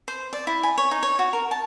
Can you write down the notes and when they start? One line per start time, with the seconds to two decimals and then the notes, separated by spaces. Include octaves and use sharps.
0.08 C5
0.33 D5
0.47 E4
0.63 G#5
0.78 C#5
0.91 D#4
1.03 C#5
1.19 F#4
1.33 A#4
1.51 A5